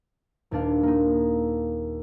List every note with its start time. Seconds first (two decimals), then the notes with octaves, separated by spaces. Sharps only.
0.51 D#1 D#2 D4 F5
0.83 A#3 D#4